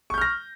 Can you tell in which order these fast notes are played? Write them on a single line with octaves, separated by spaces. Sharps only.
C#6 G6 F6 A#6